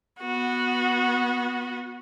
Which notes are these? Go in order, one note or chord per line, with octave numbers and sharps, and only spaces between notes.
B3 F#4